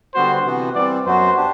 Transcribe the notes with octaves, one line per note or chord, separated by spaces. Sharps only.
D3 G3 B3 F#4 C5
C3 E3 B3 F#4
E3 G3 C4 D5
F#2 F#3 B3 F#4 C5
D4 G4